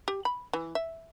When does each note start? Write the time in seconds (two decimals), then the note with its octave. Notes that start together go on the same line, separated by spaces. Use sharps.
0.08 G4
0.25 B5
0.53 E3
0.75 E5